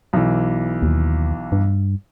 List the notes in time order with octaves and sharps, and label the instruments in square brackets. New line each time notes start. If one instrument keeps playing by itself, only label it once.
[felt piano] B1 E3
[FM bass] D#2
G2